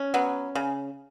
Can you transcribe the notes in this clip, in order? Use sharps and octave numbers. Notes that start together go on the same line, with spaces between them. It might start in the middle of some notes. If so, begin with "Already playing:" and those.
Already playing: C#4
F#3 B3
C#3